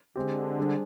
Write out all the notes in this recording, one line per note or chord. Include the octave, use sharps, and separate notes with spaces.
D3 G#3 C4 G4
G3 D4 G#4 C5